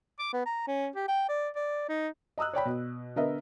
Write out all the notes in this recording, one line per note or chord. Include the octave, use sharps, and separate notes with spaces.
D6
B3
A#5
C#4
G4
G5
D5
D5
D#4
D#5 A#5 D#6 E6 F#6
C#5 D5 G5 B5
B2
D3 B3 A#4 D#5 E5